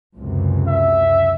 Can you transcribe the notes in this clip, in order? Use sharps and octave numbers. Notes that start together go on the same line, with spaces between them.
C#2 F#2 C3
E5